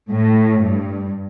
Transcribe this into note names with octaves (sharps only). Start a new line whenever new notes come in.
A2
G2